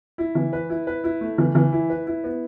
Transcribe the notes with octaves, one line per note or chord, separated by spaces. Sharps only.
E4
E3
B4
E4
B4
E4
A3
E3
E3
E4
B4
E4
B3